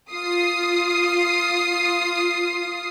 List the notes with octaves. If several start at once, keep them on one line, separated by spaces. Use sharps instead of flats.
F4 D#6 C7